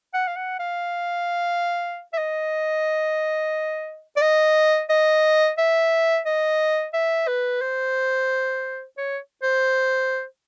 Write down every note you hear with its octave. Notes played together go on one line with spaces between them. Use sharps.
F#5
F5
F#5
F5
E5
D#5
D5
D#5
D#5
E5
D#5
E5
B4
C5
C#5
C5